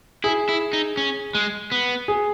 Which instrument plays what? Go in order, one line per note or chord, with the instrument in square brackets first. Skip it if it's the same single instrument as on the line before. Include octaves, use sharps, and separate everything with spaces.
[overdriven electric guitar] E4 [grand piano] G#4
[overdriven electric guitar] E4
D#4
C#4
G#3
B3
[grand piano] G#4